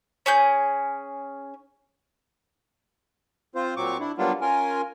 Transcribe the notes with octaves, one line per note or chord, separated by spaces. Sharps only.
C#4 G#4 G6
C4 F4 C5
A#2 F#3 C4 C#6 D6
D4 E4
F#3 G3 A#3 B3 D4 F4
C#4 F4 A#4 G#5